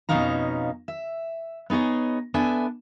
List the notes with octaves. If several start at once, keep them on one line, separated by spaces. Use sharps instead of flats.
F2 B2 C#4 D#4 F5 A#5
E5
B3 D#4 G#4 C#5 D#5
B3 D4 A4 E5 G#5